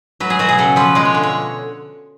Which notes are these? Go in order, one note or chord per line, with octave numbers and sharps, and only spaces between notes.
F#3 B4
G#4
B2 F#4
G#4
C#3 A4
F3 B4
G#3 D5
C#5
D3
C#5